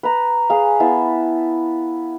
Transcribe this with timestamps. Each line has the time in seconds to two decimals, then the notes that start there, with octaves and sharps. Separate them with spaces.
0.03 B4 A#5
0.50 G#4 F5
0.80 B3 E4 A5